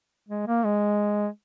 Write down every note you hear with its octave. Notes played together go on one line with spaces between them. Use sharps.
G#3
A#3
G#3